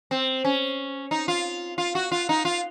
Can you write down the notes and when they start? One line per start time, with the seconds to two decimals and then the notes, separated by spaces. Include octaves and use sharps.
0.11 C4
0.45 C#4
1.11 D#4
1.28 F4
1.78 F4
1.95 F#4
2.12 F4
2.29 D#4
2.45 F4